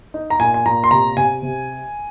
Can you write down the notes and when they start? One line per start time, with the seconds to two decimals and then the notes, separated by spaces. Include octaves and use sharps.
0.14 D#4
0.30 A#5
0.39 A#2 G#5
0.54 G#5
0.66 A#2 A#5
0.84 C6
0.91 C3 A#5
1.17 C3 G#5
1.42 C3